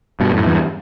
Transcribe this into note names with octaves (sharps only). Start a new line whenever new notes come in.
G2 B2
F#2 A2
E2 G2